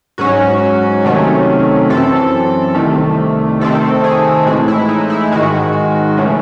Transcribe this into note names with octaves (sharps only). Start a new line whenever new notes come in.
G#2 F#3 C#4 F#4
C3 D#3 F#3 A3 C#4
F#2 E3 C4 A4
C2 C3 D#3 A3
C3 D#3 A3 C4 A4
G#4
A2 E3 G#3 F#4
E4
D#4
E4
G#2 D#3 G#3 F#4
C#3 E3 A3